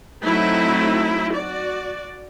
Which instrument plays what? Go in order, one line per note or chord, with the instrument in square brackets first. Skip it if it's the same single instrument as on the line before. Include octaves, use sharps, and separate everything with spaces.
[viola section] F#3 A3 C4 D#4 E4
F#4 D5